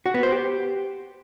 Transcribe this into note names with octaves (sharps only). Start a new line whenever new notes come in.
F#4
B3
C5
G4